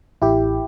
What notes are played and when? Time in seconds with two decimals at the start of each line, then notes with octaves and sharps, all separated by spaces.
0.22 A1 E4 G4